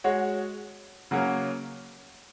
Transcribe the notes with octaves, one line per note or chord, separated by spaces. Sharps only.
G#3 F#4 C#5
C#3 F#3 A#3 C#4